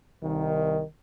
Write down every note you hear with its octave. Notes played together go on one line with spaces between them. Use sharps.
C2 D#3